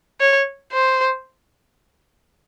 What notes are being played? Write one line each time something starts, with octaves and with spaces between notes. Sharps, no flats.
C#5
C5